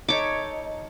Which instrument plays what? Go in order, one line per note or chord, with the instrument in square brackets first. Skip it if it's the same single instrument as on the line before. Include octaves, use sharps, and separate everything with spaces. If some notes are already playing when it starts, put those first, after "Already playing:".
[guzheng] D#4 A4 E5 [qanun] C#5 D6